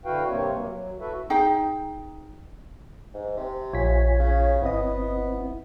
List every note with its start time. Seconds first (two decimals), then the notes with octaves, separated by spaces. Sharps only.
0.05 D3 E4 F#4 B4 F5 G5
0.29 G2 C3 A#3 C4 C#5
0.53 F#3 A#3
0.69 F#3
1.00 E4 F#4 A4 B4 E5
1.30 D#4 G#4 G5
3.14 G#2
3.37 C3
3.73 A#1 F4 C#5 G#5 B6
4.19 C#3
4.62 G1 B3 C4 E4 D#5